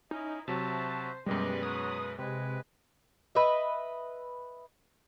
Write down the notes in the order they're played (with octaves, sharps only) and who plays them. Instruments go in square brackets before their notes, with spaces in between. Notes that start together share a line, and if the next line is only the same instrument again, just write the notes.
[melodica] C#4 [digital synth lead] D#4 [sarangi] E4
[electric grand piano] C3 F#3 [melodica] F#4 E5 [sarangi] C5 [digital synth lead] A5
[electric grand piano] F#2 B2 G#3 [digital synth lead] G3 [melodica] G4 D#5 [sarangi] B4
[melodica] F#3 C#5 [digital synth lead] D#6
[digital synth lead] C3 [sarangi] G#3 [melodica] B4
[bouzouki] B4 D#5 E5